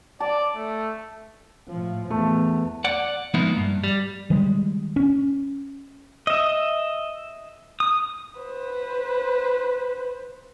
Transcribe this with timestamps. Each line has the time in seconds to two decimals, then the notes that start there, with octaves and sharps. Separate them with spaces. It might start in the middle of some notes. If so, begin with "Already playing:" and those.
0.20 D5 A5
0.56 A3
1.68 A2 F3
2.10 E2 A3
2.85 D5 F#5
3.34 F3 G#3 A#3 B3 D#4 E4
3.57 G2
3.84 G3
4.30 D#3 G3 G#3
4.96 C#4
6.27 D#5 E5
7.80 D#6
8.41 B4 C5